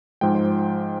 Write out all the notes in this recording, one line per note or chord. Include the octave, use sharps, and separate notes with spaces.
G#2 F3 G#3 G5
C5